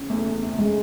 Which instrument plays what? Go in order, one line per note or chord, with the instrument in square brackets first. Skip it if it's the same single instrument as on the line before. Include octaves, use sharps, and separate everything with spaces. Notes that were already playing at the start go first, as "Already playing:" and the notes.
Already playing: [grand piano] C#3
[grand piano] E2 [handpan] A3
[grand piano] E2
C3
[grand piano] C#3 [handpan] G#3